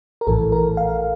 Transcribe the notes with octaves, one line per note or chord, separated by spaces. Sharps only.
A#4
A#1 A2 E3 A4
A#4
F5